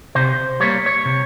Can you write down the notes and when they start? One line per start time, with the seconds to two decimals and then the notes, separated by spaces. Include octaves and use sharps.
0.15 C3 C5
0.60 G3 A#3 C#5
0.86 C#5
1.05 C3